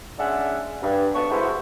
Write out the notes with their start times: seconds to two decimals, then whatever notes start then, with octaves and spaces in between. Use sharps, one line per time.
0.18 G#3 C#4 D4 E5 F#5
0.83 G2
1.14 D2 G2 B3 A5 C#6
1.31 G#3 B3 E4 F#4 C5